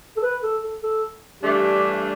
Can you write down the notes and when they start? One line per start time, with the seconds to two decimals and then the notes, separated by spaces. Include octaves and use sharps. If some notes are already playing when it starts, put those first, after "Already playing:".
0.17 A4
0.23 B4
0.43 A4
0.63 A4
0.83 A4
1.43 G2 E3 A3 D4 G4